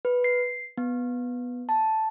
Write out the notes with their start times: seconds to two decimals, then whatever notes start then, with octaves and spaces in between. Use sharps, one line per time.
0.05 B4
0.24 C7
0.78 B3
1.69 A5